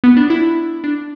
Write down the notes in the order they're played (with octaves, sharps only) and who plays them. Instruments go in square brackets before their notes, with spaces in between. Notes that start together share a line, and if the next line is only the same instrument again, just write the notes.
[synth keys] B3
D4
E4
D4